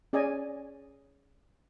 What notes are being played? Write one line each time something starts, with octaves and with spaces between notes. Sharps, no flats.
C#4 G#4 D5 D#5 G#5